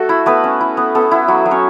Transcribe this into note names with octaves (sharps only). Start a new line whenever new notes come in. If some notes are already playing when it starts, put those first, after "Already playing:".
Already playing: A3 F#4 A4
E4
A3 B3 B4
C#4
E4
B3
B3 A4
E4
F#3 F#4
F#3
C#4 C#5